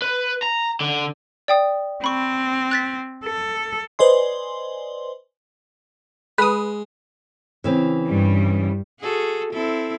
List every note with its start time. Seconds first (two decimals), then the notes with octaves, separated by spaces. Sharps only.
0.02 B4
0.43 A#5
0.81 D3
1.48 D5 G5 D#6
2.04 C4 B5 C#6
2.71 F#6 A6 B6
3.25 A4
3.99 B4 C5 D5 D#5 G#5 C6
6.38 G#3 B4 D#6
7.64 C#3 E3 C4
8.05 G2 G3
9.00 F#4 G#4 A4
9.52 C4 E4 A4